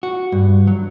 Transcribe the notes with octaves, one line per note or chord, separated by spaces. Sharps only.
F#4
G2
F#3